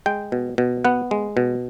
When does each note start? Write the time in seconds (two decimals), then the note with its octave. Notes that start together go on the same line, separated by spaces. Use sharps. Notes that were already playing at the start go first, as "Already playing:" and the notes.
0.06 G#3 G5
0.32 B2
0.58 B2
0.85 B3 F#5
1.11 G#3
1.37 B2